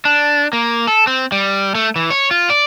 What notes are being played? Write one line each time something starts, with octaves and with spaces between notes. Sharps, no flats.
D4
A#3
A4
C4
G3
A3
E3
C#5
F4
D5